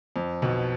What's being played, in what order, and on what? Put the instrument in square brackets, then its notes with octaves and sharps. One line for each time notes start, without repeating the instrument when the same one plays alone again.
[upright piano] F2
B1 B2